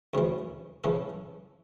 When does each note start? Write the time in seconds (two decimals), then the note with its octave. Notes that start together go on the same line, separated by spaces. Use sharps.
0.14 D2 C#3 E3
0.84 C#3 E3 A4